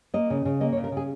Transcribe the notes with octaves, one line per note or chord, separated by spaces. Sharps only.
A#3 D#5
C#3
C#3
A#3 D#5
C#5
C#3
A#4
C#3
G#4